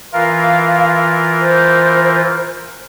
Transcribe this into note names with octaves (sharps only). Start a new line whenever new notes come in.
E3 F4 A#4 F5
C5